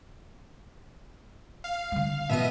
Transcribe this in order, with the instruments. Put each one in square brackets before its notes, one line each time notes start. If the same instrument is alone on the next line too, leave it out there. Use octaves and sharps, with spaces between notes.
[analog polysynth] F5
[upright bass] D3 G3
[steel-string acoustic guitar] B2 B3 D#5 [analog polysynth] E5 D#7